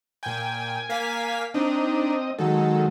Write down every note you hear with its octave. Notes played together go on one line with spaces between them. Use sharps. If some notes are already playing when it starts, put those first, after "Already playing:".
A#2 G5 G#5
A#3 F5 B6
C4 D4 D#4 D#5
D#3 F#3 G#3 A4